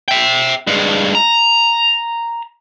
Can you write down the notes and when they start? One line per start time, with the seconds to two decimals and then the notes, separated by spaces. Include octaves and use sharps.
0.08 E5 G5
0.67 G2 G#3
1.15 A#5